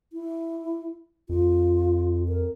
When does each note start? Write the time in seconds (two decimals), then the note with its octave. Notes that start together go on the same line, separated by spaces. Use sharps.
0.13 E4
1.29 F2 F4
2.29 A#4